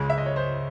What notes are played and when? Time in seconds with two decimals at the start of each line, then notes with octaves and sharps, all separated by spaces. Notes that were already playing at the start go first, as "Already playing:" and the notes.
Already playing: C#2 C#3 G#3
0.10 E5
0.18 D#5
0.26 C#5
0.36 C5